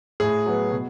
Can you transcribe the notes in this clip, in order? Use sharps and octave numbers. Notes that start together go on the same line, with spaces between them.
A2 G#4
F#3 B3
B2